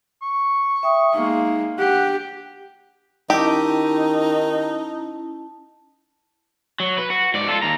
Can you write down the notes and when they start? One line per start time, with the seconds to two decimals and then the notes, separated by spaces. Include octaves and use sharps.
0.22 C#6
0.83 E5 G5 D#6
1.14 G#3 A#3 D#4
1.79 D4 G4 F#5 G5
3.30 D#3 C#4 D#4 E4 G4 A5
6.80 F#3
6.98 B4
7.10 F#4
7.34 G#2 D5
7.48 F4 A4
7.62 D#2 A#5